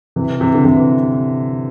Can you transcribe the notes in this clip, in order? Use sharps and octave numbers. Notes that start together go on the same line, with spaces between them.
C3 E3
C3 E3
D3
C3 E3